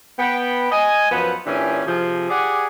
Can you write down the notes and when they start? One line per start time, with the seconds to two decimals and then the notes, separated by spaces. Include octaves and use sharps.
0.19 B3 G5
0.72 D#5 G#5
1.12 F#2 F3 B3 B4 C5
1.46 A#2 E3 C#4 D4 G4 G#5
1.86 C3 F3 G#4
2.30 G4 G#4 D5 F#5 G#5